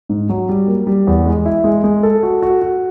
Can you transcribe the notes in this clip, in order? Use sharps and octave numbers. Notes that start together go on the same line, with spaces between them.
G#2
F#3
G3
A#3
G3
E2
G#3
E4
G#3
G#3
A4
F#4
F#4
F#4